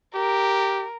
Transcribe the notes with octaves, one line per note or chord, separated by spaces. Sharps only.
G4 A#4